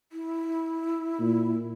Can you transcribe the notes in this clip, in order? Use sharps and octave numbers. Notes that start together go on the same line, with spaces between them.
E4
A#2